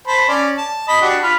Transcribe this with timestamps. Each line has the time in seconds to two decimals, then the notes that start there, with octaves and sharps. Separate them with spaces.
0.07 C5 A5 B5
0.28 C#4 D5
0.58 A5
0.88 D#5 B5
1.01 D4 F#4 G4
1.22 F4 B5